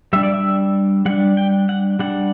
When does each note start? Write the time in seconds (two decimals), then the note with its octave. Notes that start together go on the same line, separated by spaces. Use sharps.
0.13 G3 D4 E5
0.23 D5
0.34 E5
1.06 G3 D4 F#5
1.37 G5
1.69 F#5
1.99 G3 D4 F#5